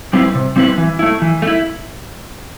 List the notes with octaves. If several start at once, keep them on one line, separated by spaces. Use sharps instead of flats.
G3 C4 E4 B4
C3
G3 C4 E4 B4
E3
A3 E4
E3
A3
E4